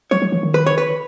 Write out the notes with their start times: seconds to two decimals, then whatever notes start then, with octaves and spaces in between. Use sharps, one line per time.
0.11 F#3 C#5
0.22 F#3
0.32 E3
0.43 D#3
0.54 B4
0.66 C#5
0.78 B4